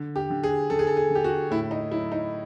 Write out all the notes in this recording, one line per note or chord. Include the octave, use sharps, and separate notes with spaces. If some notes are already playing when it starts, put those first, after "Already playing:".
Already playing: D3
G4
D3
G#4
D3 A4
G#4
A4
G#4
D3
G4
F#4
A2 E4
D#4
F#3 E4
D#4